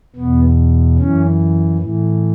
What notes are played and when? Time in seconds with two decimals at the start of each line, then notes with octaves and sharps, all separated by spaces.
0.16 E2 B2 B3
0.98 F#2 E3 C#4
1.79 A2 E3